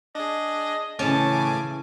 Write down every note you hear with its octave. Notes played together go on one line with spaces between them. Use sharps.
D4 G#4 D#5
A2 C#3 E3 C#4 G#5 A5 D6